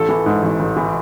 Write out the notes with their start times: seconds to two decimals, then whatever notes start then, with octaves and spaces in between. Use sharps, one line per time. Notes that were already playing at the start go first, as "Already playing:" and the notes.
Already playing: A1 A4
0.09 E3
0.26 G#2
0.43 A1
0.60 A1
0.77 E3